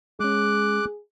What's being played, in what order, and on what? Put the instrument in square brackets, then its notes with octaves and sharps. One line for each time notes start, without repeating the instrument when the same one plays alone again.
[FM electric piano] G#3 C#4 [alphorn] G#4 [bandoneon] D6 F#6